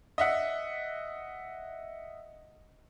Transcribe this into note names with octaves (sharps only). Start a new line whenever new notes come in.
D#5 E5 F#5